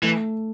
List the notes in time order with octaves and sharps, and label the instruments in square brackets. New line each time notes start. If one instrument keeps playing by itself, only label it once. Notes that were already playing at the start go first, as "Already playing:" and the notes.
[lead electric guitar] E3 [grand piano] A3